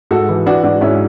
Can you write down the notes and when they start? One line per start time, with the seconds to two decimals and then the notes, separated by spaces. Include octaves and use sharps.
0.11 G#2 F#4 A4
0.29 E3
0.46 E3 D4 F#4
0.63 G#2 D4 F#4
0.81 G#2 C#4 E4